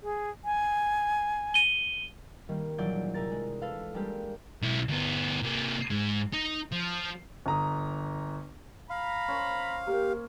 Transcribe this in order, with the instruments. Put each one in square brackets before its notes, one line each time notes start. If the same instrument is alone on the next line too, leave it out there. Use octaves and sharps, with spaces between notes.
[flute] G#4
G#5
[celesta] D#7 G7
[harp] D#3 G3 A#3
A#1 E3 F#3 D4 D5 G6
C3 G#4 A#4 A6
G#3
A4 B4 F5
G3 G#3 A#3 D4 G4 G#4
[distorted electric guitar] B1 E4
D2 B3
C3 A#3
G#2 G#3
D#4
F3
[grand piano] G1 A#5 D#6
[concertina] F5 [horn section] A#5 B5
[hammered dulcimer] C#4 C5
[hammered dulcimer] A#3 [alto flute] G4